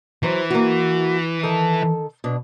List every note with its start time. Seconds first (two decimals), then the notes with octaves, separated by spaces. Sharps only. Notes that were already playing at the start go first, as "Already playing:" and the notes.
0.23 E3 F#3 C5
0.50 A#3 F#4
1.43 D#3 A4 A5
2.24 B2 D4